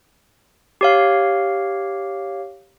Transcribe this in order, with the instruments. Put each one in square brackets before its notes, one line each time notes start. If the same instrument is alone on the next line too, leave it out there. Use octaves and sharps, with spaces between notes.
[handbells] G4 C#5 F5